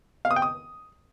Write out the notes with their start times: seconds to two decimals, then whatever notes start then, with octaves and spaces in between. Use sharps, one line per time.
0.25 F5
0.31 D#6
0.36 G5
0.42 D#6